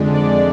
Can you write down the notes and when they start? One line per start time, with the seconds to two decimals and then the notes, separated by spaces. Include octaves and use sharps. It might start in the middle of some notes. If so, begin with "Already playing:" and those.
Already playing: F2 D3 G#3 D4
0.14 D5